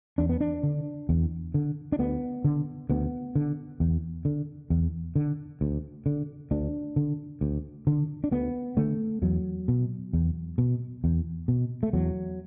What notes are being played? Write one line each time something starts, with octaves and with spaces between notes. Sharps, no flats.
E2 D4
B3
D4
D3
E2
D3
D4
D2 B3
D3
D2 B3
D3
E2
D3
E2
D3
D2
D3
D2 D4
D3
D2
D3
D4
D2 B3
D3 A3
E2 F#3
B2
E2
B2
E2
B2
A3
E2 F#3